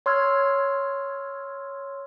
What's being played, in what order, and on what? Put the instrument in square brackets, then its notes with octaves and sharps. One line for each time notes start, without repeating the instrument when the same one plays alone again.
[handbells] C#5 C6 E6 F6 G#6